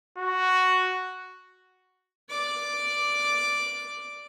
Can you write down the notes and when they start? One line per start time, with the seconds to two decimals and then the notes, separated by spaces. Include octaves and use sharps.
0.18 F#4
2.30 D5 D6